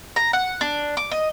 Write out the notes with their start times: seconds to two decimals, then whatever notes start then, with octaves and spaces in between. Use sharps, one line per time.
0.16 A#5
0.33 F#5
0.61 D4
0.97 D6
1.11 D#5